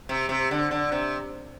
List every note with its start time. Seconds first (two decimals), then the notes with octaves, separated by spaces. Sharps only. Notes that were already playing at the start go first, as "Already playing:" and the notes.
0.09 C3
0.29 C3
0.51 D3
0.71 D3
0.92 C3